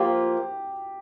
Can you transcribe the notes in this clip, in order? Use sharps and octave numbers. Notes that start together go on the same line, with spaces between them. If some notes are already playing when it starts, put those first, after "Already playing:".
Already playing: F3 A#3 F4 G4